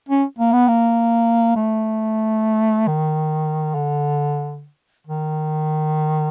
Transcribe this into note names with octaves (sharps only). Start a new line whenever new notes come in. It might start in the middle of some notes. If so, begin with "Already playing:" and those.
C#4
A#3
B3
A#3
A3
D#3
D3
D#3